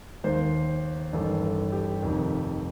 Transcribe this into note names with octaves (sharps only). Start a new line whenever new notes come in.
D#2 D#3 C5
A1 G2 D#3 A4
A4
G4
F1 F2 D#3